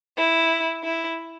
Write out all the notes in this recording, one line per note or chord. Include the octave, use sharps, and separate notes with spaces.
E4
E4